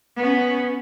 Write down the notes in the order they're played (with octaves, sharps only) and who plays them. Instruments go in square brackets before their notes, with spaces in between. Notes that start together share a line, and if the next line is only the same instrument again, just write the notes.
[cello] B3 C#4